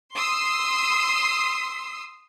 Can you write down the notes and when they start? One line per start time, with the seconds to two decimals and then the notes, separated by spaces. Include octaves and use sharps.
0.16 C6 D#6 E6 C7